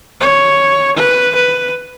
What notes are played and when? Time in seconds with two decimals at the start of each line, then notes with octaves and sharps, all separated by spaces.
0.21 C#5
0.97 B4
1.36 B4